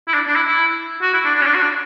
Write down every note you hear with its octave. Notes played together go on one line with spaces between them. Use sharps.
E4
D4
D4
E4
E4
F#4
E4
D4
D4
C#4
D4
F#4
D4